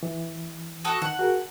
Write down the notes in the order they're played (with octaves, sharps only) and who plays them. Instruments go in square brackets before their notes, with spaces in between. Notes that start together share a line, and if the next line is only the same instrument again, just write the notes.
[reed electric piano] E3
[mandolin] F#4 A4 D#6
[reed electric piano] D#3 [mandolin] F#5
[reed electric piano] F#4 G#4 A#4